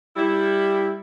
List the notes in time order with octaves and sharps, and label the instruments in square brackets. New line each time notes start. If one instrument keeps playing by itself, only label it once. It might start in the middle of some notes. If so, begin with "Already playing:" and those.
[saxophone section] G3 E4